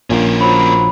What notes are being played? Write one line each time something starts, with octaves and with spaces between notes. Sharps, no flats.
A#1 A#2 A#3 C#4
F3 F#3 B5